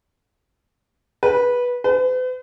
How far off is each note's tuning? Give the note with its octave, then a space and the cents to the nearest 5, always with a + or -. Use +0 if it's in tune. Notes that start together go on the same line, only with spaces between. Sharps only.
B4 -15
B4 +45